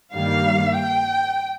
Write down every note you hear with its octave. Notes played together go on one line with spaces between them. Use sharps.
G2 D#3 G3 A#3 F5
G5